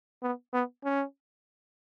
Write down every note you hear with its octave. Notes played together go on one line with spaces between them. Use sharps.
B3
B3
C#4